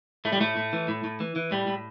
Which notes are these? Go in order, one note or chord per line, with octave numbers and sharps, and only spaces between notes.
A2 A3
G3
A2 A3
A2
E3
A2
A2
E3
E3
A2 G3
A2